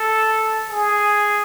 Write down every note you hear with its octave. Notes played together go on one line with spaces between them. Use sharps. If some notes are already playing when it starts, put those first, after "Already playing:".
Already playing: A4
G#4